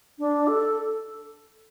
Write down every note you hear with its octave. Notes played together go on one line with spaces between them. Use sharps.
D4
A4